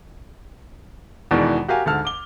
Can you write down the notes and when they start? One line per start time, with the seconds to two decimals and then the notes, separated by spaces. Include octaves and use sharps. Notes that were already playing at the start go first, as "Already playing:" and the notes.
1.31 E2 B2 D#3 E3 G#3 D4
1.68 F#4 G4 A#4 F5 G#5
1.86 D2 G#2 A4 A5 F6
2.05 D6 G7